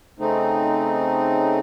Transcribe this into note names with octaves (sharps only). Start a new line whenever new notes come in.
C#3 A3 C4 D#4